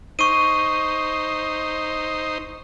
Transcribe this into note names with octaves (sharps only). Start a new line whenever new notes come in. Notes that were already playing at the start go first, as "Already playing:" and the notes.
D#4 C5 C#6 D#7